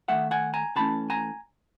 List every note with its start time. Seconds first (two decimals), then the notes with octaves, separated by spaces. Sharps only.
0.08 D#3 F#3 A3 E5 F#5
0.31 F#5 G#5
0.54 G#5 A#5
0.76 C#3 E3 A3 C#4 A5 B5
1.10 G#5 A#5